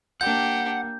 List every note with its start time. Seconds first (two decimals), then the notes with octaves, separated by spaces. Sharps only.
0.21 A#3 D4 G4 F#5 G6